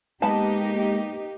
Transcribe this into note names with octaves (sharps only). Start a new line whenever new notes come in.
G#3 A#3 B3 D#4 G4 B4 A5